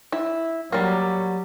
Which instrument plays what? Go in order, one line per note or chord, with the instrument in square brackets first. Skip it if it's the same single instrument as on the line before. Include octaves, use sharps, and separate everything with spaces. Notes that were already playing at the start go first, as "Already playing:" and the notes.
[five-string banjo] E4
[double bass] F#3 [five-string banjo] G3 A#3